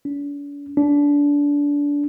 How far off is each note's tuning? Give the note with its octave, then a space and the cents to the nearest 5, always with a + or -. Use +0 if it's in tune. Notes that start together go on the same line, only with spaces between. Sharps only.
D4 -45
D4 -25